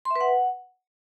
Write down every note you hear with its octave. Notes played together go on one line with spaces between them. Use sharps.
C6
E5
B4
F#5